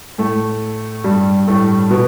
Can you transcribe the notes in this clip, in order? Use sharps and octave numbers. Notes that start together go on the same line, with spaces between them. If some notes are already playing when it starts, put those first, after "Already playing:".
A2 A3
G2 G3
A2 A3
B2 B3